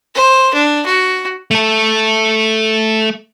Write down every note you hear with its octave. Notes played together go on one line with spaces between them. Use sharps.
C5
D4
F#4
A3 A4